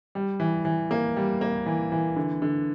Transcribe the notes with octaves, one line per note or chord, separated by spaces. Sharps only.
G3
E3
E3
A#3
G3
A#3
E3
E3
D3
D3